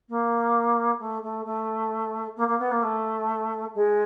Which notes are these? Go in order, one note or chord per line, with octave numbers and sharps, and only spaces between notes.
A#3
A3
A3
A3
A#3
A#3
B3
A#3
A3
G#3